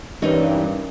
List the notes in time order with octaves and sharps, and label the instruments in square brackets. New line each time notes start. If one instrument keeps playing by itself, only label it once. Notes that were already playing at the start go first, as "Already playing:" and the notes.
[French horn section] G2 [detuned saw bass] E3 [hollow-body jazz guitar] C#4 A#4 C#5 [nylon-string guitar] D#4 D#5